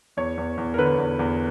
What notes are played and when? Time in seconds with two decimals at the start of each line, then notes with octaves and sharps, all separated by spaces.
0.17 E2 C#5
0.37 E2
0.58 E2
0.74 A#4
0.78 D3 B4
0.98 E2
1.19 E2